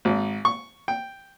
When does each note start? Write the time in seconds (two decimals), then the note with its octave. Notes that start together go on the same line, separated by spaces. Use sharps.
0.05 G#1
0.45 C#6
0.88 G5